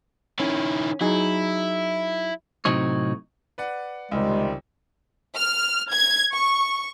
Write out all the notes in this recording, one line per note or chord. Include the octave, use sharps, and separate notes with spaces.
D#3 C#4 E4
F#3 D#4 E4 G#4
A2 C3 F#3 C4 D#4 C#5
B4 D5 F#5
C#2 C3 D#3 G3 G#3
F6
G#6
C#6